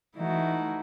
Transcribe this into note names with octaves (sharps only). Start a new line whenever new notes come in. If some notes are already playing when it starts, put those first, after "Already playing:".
E3 A3 D#4 E4 F#4